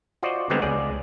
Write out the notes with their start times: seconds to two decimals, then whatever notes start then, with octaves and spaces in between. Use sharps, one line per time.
0.23 F4 F#4 C5 D5 D#5
0.50 D3 G3 G#3 B3 C4 D#4
0.62 C#2 G#4 D5